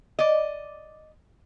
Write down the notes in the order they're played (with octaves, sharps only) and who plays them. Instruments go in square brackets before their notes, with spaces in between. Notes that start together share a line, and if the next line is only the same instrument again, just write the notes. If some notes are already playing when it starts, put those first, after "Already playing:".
[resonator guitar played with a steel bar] D5 D#5